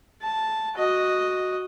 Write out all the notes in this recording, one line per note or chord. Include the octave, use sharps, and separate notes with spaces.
A5
F#4 D#5